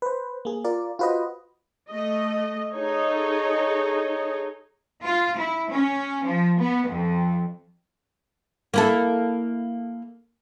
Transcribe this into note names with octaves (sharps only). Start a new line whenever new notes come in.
B4 C5
A#3 G#4
F4 A#4 D5
F4 F#4 B4 C5 D#5
A3 D#5
D#4 G#4 A4 C#5 D#5
F4
E4
C#4
F3
B3
F2
A#3 E4 A4